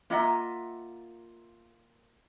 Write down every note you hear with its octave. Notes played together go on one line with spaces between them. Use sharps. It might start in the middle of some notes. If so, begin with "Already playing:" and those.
A#3 F4 D#5 E5 F#5 A#5